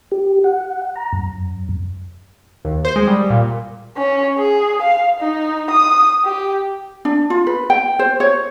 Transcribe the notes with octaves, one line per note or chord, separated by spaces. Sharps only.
G4
F#5
A#5
F#2
D#2
C5
G#3
G3
A#2
C#4
G#4
F5
D#4
D#6
G4
D4
F4
B4
G5
C5
C#5